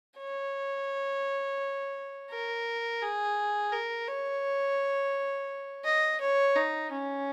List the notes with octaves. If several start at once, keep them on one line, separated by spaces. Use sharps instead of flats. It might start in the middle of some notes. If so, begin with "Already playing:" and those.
C#5
A#4
G#4
A#4
C#5
D#5
C#5
D#4
C#4